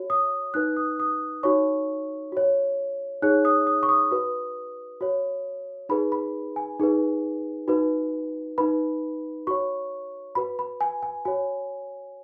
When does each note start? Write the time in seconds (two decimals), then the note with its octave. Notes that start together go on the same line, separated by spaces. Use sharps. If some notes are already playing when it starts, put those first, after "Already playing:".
Already playing: F#4 C#5
0.10 D#6
0.54 D#4 B4 F#6
0.77 D#6
1.00 D#6
1.43 D#4 F#4 C#5 C#6
2.32 F#4 C#5
3.22 D#4 G#4 C#5 F#6
3.45 D#6
3.67 D#6
3.83 C#6
3.89 D#6
4.11 F#4 B4
5.01 F#4 C#5
5.89 D#4 G#4 B4 B5
6.12 B5
6.56 G#5
6.80 D#4 G#4 B4
7.68 D#4 F#4 B4
8.58 D#4 B4 B5
9.47 F#4 C#5 C#6
10.35 F#4 B4 B5
10.59 B5
10.81 G#5
11.03 G#5
11.25 F#4 C#5 G#5